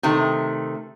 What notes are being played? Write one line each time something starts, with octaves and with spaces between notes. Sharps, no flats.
C3 D#3 A3